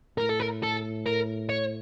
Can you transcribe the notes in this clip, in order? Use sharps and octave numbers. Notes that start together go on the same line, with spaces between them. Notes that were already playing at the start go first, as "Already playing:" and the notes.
A2 A#4
A4
A#4
A4
A#4
C#5